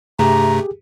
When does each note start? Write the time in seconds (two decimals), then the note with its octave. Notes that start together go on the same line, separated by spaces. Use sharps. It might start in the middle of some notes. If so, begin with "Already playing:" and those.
0.19 G2 C3 A3 G4 G#4 A#5